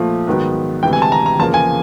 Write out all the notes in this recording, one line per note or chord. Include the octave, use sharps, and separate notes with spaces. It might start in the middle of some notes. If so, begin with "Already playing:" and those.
Already playing: A#2 F3 A3
G#2 D#3 F#3 B3
D2 C3 E3 G#3 G5
G#5
A5
A#5
A#5
E2 C#3 F3 A#3 A5
G#5